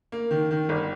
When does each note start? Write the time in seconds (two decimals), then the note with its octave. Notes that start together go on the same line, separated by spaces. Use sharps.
0.12 A#3
0.31 D#3
0.51 D#3
0.69 G1